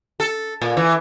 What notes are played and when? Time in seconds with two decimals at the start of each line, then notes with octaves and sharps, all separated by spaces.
0.20 A4
0.62 A#2
0.77 E3